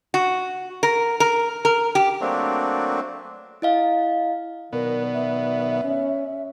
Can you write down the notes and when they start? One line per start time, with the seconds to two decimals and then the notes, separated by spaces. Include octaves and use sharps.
0.14 F#4
0.83 A#4
1.20 A#4
1.65 A#4
1.95 G4
2.21 F#3 A3 A#3 C4 D4
3.62 E4 D#5 F5
4.73 B2 D#3 F#3 B3 A#4 D5
5.13 E5
5.84 C#4